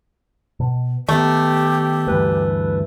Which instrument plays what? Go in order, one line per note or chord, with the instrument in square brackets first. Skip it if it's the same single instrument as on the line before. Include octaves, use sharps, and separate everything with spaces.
[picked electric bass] B2
[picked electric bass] D#3 B3 [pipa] A3 [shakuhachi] G4
[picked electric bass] D2 G2 E3 [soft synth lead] B4